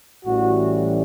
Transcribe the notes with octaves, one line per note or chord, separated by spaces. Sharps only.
A1 A2 E3 G3 F#4